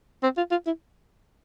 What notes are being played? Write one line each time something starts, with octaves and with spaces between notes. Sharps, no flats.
C4
F4
F4
E4